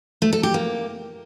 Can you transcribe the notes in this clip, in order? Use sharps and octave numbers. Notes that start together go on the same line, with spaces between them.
A3
A4
G4
A#3